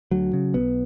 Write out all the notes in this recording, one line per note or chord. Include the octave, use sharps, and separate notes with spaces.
D2 F#3
C#3
B1 B3